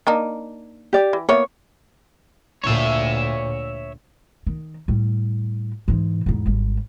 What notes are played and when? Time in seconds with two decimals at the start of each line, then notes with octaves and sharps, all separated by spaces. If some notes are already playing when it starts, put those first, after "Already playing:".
0.07 A#3 D4 D#4
0.93 G4 D5
1.13 E3
1.29 A#3 B3 E4 C#5
2.64 D2 A#2 C#5 E5
4.47 D#3
4.88 A2 G3
5.88 G#2 E3
6.26 E2 G#2
6.46 G#1 G3